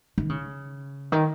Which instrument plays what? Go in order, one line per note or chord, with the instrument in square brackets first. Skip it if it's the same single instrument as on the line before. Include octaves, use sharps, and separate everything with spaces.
[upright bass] D#3
C#3
D#3